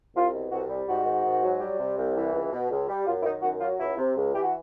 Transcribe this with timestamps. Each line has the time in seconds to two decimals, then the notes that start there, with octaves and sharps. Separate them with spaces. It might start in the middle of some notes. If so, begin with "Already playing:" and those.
0.15 C2 F4
0.33 B2
0.51 C2 F#4
0.69 G3
0.88 G#2 F#4
1.05 D#3
1.24 G#2
1.43 F#3
1.60 G3
1.78 C3
1.97 C2
2.16 E3
2.33 C#2
2.51 B2
2.70 C#2
2.89 G3
3.06 F#2 F4
3.21 E4
3.24 D#3 D#4
3.42 F#2 F#4
3.60 F#3 F4
3.79 C#2 E4
3.98 C3
4.16 C#2
4.33 E3 G4
4.42 F#4